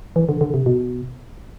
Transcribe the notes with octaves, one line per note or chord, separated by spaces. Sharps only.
E3
D3
D3
C3
B2